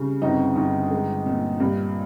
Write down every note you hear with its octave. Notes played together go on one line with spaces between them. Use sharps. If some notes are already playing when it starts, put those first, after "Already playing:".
Already playing: C#3 G3
G1 C4 D#4
G1
G#3
A#2
G2